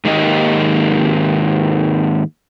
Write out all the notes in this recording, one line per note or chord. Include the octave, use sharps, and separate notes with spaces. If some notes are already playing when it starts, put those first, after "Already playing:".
G#2 D#3 A#3 G4 D#5